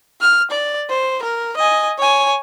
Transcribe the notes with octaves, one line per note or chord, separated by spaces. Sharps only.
F6
D5
C5
A#4
D#5 G#5
C#5 G#5